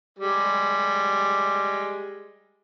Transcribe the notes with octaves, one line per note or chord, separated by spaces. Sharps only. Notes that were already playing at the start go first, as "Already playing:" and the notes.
G3 G#3